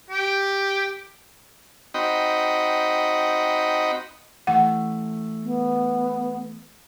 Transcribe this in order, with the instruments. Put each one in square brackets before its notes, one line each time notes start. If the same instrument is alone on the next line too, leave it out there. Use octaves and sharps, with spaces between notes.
[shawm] G4
[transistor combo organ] C4 D#4 F#4 D#5 G5 B5
[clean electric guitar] E3 A3 [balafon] F#5
[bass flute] B3